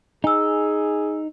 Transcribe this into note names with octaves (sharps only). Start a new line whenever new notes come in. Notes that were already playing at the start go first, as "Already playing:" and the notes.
D#4 G#4 G#5 E6